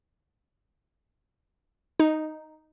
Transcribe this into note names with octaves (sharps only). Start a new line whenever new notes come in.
D#4